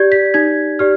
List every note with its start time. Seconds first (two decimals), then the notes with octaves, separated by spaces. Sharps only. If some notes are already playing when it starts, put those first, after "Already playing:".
Already playing: G4 D5 G6 G#6
0.12 B6
0.34 D#4 G#6
0.79 G4 D5 F6